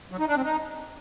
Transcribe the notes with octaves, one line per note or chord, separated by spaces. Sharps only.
F#3
D#4
D4
C4
D#4